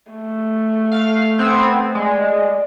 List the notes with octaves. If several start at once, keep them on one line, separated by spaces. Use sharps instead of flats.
A3
F5 F6
B3 C4 G#6
G#3 D5